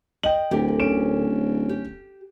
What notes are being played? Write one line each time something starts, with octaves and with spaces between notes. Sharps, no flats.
D#5 G5 F#7
D1 D2 G4 A#4
C#4 D7 E7
G4